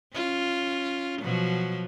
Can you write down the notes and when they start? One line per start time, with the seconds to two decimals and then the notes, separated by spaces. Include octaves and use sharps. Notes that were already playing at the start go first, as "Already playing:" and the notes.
0.13 C#4 F4
1.21 B2 F3 F#3